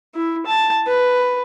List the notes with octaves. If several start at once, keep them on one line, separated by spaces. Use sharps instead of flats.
E4
A5
B4